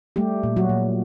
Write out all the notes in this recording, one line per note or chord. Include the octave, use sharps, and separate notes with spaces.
G3 A3 G4
A#2
F#3 F#4
A#2